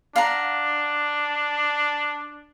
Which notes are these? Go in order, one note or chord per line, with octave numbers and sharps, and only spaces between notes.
D4 F5 F#5 A#5